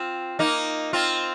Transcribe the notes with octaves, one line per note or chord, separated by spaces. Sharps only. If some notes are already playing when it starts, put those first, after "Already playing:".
Already playing: C4 F4
A#3 D#4
C4 F4